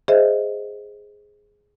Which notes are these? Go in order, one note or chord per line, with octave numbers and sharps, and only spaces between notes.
G#4 C5 D#5 E5